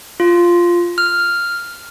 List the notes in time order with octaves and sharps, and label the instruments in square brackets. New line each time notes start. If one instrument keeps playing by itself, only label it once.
[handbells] F4
F6